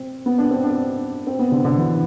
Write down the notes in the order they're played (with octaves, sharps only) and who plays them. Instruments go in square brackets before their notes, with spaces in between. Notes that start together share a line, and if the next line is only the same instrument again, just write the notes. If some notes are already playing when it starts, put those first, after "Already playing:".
Already playing: [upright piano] C4
B3
D4
C4
D4
C4
B3
D3
D3
E3